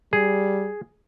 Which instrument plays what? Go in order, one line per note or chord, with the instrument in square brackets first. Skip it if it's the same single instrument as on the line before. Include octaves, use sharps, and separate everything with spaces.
[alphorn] G3 [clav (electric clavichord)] G#4